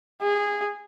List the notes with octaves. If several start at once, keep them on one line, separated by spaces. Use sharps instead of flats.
G#4